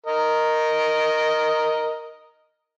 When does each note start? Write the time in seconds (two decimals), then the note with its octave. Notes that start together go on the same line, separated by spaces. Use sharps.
0.06 A#4 D#5